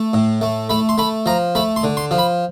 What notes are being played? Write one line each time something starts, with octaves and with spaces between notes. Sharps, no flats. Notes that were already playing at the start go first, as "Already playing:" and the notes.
Already playing: A3
A2
A3
A3 B5
C6
A3 B5
F3 A#5
A3 B5
C6
D3
C6
F3
B5